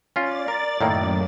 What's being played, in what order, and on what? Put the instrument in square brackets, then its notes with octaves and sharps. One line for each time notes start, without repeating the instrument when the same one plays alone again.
[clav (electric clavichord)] C#4 F4 [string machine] D5 A6
[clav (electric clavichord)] A#4
[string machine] F#2 [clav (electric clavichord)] A2 D#3 A#3